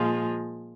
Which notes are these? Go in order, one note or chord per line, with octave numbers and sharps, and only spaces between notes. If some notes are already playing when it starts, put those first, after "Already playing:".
Already playing: A#2 F3 G#3 F4